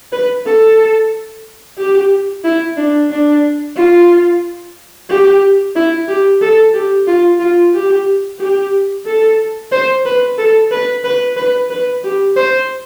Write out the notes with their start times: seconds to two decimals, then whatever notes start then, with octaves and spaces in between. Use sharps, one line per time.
0.12 B4
0.46 A4
1.78 G4
2.44 E4
2.77 D4
3.11 D4
3.76 F4
5.09 G4
5.75 E4
6.08 G4
6.41 A4
6.73 G4
7.07 F4
7.40 F4
7.74 G4
8.39 G4
9.05 A4
9.72 C5
10.05 B4
10.37 A4
10.71 B4
11.04 B4
11.37 B4
11.70 B4
12.04 G4
12.36 C5